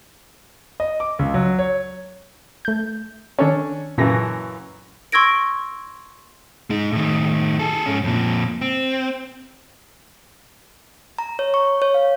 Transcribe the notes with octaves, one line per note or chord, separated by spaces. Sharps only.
D#5
D6
C#2
F#3
C#5
A3 G6
D#3 C#4 D4 A4 C#5
F#2 A#2 C#3 E3 A5 A#6
C6 C#6 E6 G#6 A#6 D7
G#3 D#4
A2 D#3
G#4 A4
G#2 C#4
F2 A#2
C4
A#5
C#5
C#6
C#5
F5